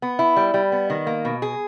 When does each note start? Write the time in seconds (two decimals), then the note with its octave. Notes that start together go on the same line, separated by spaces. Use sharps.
0.02 B3
0.19 E4
0.36 G3
0.54 G3
0.72 B3
0.90 D#3
1.07 A#3
1.25 B2
1.42 G#4